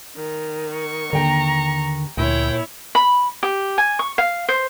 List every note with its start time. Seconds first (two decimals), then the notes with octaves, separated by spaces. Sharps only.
0.16 D#3
0.72 C#6
1.13 D#2 D3 G5 A#5
2.17 D2 A#2 E4 C#5 G5
2.95 B5
3.43 G4
3.78 G#5
3.99 C#6
4.18 F5
4.49 C5